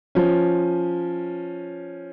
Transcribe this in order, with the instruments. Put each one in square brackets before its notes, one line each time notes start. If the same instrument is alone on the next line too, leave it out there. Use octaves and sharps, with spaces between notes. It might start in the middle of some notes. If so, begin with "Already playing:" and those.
[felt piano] F3 C#4